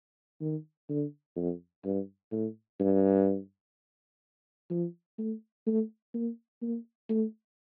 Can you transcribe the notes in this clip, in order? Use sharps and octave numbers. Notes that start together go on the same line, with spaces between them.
D#3
D3
F2
G2
A2
G2
F3
A3
A3
A#3
A#3
A3